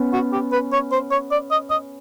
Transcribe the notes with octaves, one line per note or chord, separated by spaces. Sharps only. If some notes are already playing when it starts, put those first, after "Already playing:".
Already playing: B3 C#4
F#4
G4
B4
C#5
C5
C#5
D5
D#5
D#5